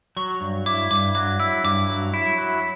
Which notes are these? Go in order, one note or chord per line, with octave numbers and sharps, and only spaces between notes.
F#3 C#6
G2
E4 D6
G2 D6
F#3 D6
E4 E6
G2 D6
F#3
E4
F#3